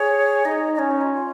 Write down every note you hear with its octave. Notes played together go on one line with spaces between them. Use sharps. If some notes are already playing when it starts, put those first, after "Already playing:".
Already playing: G#4 C#5
D#4 D#5
D#5
C#4 C#5
D#4
F4
F4